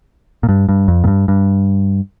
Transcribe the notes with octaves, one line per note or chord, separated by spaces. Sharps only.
A#2
G2
G2
F2
A#2
G2
G2